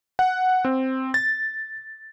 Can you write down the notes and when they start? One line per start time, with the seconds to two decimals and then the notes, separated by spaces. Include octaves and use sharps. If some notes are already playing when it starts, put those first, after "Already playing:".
0.19 F#5
0.65 C4
1.14 A6